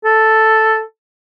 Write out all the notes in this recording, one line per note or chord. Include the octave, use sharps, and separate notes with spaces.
A4